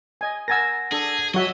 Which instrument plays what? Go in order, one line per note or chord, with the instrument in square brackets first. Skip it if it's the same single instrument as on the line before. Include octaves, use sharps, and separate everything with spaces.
[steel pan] D#5 G#5
[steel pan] A#4 G#5 E6 [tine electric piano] F#5 A6 A#6
[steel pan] D4 A4 [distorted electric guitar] G#4
[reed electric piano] F#3 F#4 [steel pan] C#5 E5 [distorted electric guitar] D#5